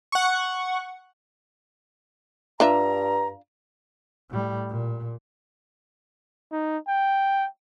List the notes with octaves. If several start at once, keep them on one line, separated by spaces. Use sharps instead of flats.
F#5 C#6
G2 D4 F4 E5 A#5
A2 G3
A#2
D#4
G5